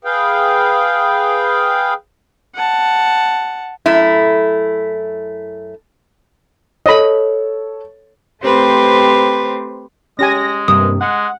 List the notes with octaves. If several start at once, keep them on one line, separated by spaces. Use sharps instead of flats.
G#4 B4 F5 G5
F#5 A5
F#2 A3 E4
A4 C#5 D#5 B5
A3 C4 G4 B4 C5
G#3 C#4 G4 G#5 A#6
G2 C3 A#3 D#6
G#3 F#5